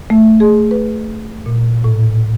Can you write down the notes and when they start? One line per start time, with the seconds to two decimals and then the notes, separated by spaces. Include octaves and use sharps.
0.10 A3
0.40 G#4
0.71 B4
1.46 A#2
1.84 A2